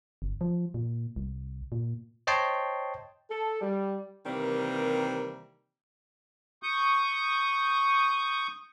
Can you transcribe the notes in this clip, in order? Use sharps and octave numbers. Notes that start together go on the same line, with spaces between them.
G1
F3
A#2
C2
A#2
C5 C#5 D#5 G5 A5 C6
A4
G3
C3 D#3 E3 G3 A#3 C4
C#6 D#6 G6